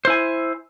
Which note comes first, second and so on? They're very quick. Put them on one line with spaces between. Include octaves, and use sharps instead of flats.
C5 E4 G#5